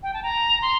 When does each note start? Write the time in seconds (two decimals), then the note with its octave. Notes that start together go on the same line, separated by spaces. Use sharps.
0.03 G5
0.14 A5
0.23 A#5
0.62 C6